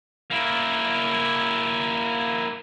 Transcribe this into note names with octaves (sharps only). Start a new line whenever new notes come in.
A#3 E4